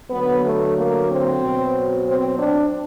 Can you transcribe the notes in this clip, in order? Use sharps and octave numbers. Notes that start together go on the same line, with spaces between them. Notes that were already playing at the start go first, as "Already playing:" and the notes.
D3 F#3 B3
A3
A#3
C4
B2 F#3
C4
D4